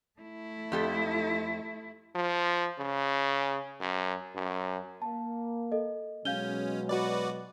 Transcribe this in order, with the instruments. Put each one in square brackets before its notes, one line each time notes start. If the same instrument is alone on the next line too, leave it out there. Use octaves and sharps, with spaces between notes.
[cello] A3 E4
[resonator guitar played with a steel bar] F2 G4 A4
[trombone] F3
C#3
F#2
F#2
[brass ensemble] A#3 [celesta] A5
[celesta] A4 D#5
[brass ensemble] B2 F#3 G#3 [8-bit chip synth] C#4 [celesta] F5 G6 G7
[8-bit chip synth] F#4 B4 D5